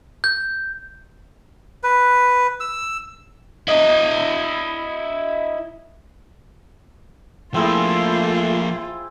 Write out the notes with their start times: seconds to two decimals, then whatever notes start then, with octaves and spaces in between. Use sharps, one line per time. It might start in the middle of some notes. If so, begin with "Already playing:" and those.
0.24 G6
1.83 B4
2.60 E6
3.68 E4 D#5
7.54 F3 A3 A#3 C4 E4 F4 G#4